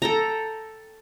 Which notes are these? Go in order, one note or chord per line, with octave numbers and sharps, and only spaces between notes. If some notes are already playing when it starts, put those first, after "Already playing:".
A4 G5 A#5